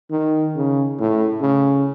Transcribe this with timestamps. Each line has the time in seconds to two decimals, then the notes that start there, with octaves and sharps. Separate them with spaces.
0.11 D#3
0.55 C#3
0.99 A2
1.41 C#3